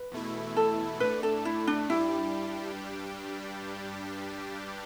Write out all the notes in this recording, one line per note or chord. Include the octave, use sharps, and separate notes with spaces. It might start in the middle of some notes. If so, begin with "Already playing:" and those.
Already playing: B4
E2 B2 A3 E4
A4
A2 A3 D4 B4
A4
E4
D4
G2 G3 D4 E4 G4